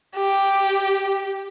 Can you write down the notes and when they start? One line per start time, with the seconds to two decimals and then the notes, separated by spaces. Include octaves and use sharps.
0.16 G4